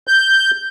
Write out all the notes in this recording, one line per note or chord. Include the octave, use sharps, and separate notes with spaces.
G6